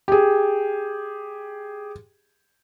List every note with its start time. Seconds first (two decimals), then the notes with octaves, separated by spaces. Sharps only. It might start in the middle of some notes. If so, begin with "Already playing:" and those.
0.08 G4 G#4